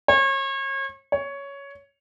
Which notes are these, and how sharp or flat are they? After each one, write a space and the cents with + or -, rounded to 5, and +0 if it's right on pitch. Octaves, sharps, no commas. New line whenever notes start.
C#5 -35
C#5 +10